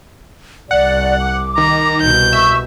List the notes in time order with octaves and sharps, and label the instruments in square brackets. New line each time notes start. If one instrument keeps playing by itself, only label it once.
[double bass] C2 [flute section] D5 [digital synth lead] F#5
[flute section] D6
[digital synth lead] D#3 [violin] A#5
[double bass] C2 B2 [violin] G6
[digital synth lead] E5 [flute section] C#6